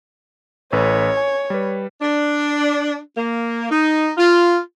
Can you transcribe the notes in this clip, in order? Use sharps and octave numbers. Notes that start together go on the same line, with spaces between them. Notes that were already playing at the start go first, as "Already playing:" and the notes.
A1 A4 B4 C#5
G#5
G3 B4
D4
A#3
D#4
F4